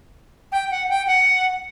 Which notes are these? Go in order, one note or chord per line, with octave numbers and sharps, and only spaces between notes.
G5
F#5
G5
F#5